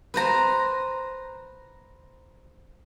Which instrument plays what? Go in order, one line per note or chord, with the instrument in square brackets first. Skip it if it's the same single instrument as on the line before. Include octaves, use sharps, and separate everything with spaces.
[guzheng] B4 C5 A#5